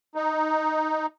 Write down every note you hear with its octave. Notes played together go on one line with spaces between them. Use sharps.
D#4